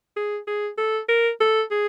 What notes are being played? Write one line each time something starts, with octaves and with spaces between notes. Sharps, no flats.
G#4
G#4
A4
A#4
A4
G#4